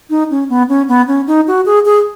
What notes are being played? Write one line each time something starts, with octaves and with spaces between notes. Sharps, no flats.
D#4
C#4
B3
C#4
B3
C#4
D#4
F#4
G#4
G#4